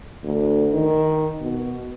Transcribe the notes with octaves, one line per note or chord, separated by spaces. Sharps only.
D2
D#3
B2